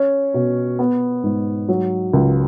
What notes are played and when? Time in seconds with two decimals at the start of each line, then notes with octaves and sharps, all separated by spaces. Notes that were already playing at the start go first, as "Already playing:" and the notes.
Already playing: C#4
0.34 B2
0.79 B3
1.24 G#2
1.69 F#3
2.13 C#2